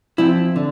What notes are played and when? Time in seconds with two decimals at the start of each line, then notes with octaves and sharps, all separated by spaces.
0.18 F3 C4 E4
0.56 D3